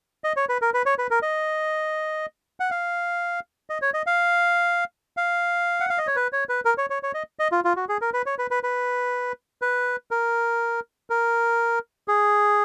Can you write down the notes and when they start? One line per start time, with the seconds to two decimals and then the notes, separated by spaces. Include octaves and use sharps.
0.24 D#5
0.37 C#5
0.49 B4
0.62 A#4
0.74 B4
0.86 C#5
0.99 B4
1.11 A#4
1.22 D#5
2.60 F#5
2.71 F5
3.70 D#5
3.82 C#5
3.94 D#5
4.07 F5
5.17 F5
5.80 F#5
5.90 F5
5.98 D#5
6.07 C#5
6.16 B4
6.33 C#5
6.49 B4
6.65 A#4
6.78 C#5
6.90 C#5
7.03 C#5
7.14 D#5
7.39 D#5
7.52 F4
7.65 F4
7.76 F#4
7.89 G#4
8.01 A#4
8.14 B4
8.26 C#5
8.38 B4
8.51 B4
8.63 B4
9.62 B4
10.11 A#4
11.10 A#4
12.08 G#4